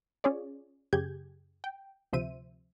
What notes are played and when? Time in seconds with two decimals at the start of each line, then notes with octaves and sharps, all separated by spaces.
0.24 C#4 F4 G#4 C#5 D5
0.93 F#2 C#3 G4 G#4 G6 G#6
1.64 G5
2.13 D2 C3 F3 C5 E5 D#7